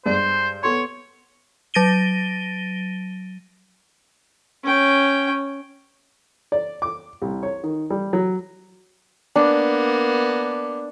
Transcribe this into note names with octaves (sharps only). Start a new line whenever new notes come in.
G2 G#3 C5 D5
B3 A4 C#5 C6
F#3 A6 A#6 D7 D#7 G7
C#4 G5
D5
D6
C2
C#5
D#3
G3
F#3
A#3 B3 D4